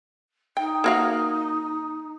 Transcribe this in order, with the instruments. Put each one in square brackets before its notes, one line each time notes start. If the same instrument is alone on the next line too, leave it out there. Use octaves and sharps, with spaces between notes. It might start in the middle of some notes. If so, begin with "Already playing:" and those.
[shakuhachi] D#4 [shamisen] G5
[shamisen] A#3 F#4 F5